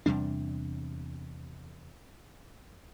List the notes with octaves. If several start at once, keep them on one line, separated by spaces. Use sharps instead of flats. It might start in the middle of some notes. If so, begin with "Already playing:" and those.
E2 C3 G3 D4